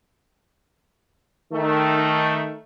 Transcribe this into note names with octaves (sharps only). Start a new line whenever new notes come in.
D#3 A3